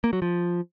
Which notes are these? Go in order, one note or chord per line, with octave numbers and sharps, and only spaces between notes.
A#3
F#3
F3